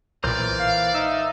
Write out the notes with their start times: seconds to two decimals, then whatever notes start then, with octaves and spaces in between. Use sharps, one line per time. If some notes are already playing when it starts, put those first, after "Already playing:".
0.24 B1 A#2 E3 A#4 C5 D5
0.59 F5
0.94 D#4 E5